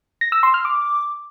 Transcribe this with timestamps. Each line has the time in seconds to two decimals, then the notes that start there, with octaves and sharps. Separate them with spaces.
0.21 A#6
0.32 E6
0.43 C6
0.54 F6
0.65 D6